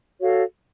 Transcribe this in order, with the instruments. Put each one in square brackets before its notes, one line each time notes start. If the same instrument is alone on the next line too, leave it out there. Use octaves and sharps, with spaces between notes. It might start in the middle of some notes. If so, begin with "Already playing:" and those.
[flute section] F#4 A4 C#5 F5